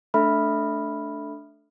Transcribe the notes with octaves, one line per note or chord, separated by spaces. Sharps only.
A3 D4 A4 E5 B5 F6